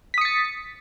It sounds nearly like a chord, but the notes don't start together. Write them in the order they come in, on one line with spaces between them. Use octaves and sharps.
B6 D#6 C#7 A6